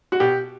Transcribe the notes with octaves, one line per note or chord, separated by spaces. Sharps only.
F#4
B2 G4